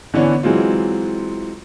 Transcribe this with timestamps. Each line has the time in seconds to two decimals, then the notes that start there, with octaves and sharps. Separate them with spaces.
0.14 D3 E3 B3 C#4 D4
0.43 E3 F#3 G#3 C4 F4